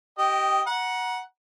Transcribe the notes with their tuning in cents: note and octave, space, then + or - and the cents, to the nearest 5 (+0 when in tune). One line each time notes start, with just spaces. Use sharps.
G4 -25 D#5 +0 G5 +0
F#5 +0 A#5 +35